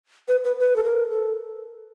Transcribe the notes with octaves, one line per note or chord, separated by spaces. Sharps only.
B4
B4
B4
A4
A#4
A4